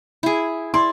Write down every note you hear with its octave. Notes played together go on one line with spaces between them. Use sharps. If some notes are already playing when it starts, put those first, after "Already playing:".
E4 G#4
E4 D5 C6